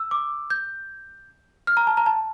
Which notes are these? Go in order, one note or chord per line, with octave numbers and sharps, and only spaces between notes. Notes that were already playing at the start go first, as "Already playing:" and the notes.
Already playing: E6
D6
G6
F6
A#5
A5
A#5
A5